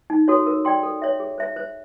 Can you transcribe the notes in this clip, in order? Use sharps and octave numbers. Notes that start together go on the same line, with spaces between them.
D#4
F#4 A4 C#5
A#4
D5 G5 C6
A4
C#5 E5
G#4
C5 E5
C5